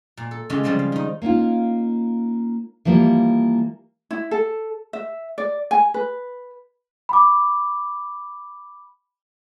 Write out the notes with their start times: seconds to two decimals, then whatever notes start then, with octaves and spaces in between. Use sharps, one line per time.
0.17 A#2
0.31 A4
0.50 C#3 E3 G#3 C#4 F4 G4
0.64 C#3 F3 G3 G#3 C4
0.79 F5
0.92 D#3 D#4
1.22 A#3 C#4 D#4 F4
2.85 E3 F3 G3 A#3
4.11 E4
4.31 A4
4.93 E5
5.38 D5
5.71 G#5
5.94 B4
7.09 B5 D6